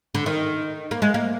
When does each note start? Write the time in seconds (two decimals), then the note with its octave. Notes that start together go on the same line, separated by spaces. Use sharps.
0.15 D3
0.26 D#3
0.91 A#3
1.02 G#3
1.14 A#3